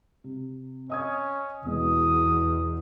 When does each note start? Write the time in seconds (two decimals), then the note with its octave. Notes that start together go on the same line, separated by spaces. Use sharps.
0.24 C3
0.90 C#4 D#5 D#6 G#6
1.66 E2 B2 G#3 D#6